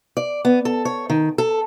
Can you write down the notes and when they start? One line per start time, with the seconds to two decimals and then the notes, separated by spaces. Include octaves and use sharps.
0.17 D5
0.45 B3
0.65 A4
0.85 C#5
1.10 D#3
1.38 A4